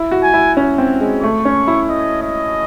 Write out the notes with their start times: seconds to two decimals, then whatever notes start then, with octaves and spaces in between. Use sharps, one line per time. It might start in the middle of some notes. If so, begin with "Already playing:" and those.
Already playing: E4
0.11 F#4
0.23 G#5
0.34 E4
0.57 C#4
0.78 C4
1.01 G#3
1.22 A3 C#6
1.45 C#4
1.67 E4
1.89 D#5
2.23 D#5